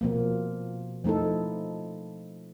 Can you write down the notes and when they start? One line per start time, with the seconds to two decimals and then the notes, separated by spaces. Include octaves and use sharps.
0.01 B2 F3 A#3
1.04 F3 A3 D#4 E4 A4